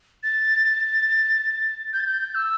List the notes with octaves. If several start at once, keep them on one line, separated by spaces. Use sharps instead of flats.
A6
G6
A6
G6
E6